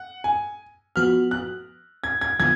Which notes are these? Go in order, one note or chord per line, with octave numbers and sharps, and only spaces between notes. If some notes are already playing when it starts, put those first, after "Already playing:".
Already playing: F#5
G#5
F3 B3 F#4 F6
F#6
G#6
G#6
D3 F3 B3 F4 G#6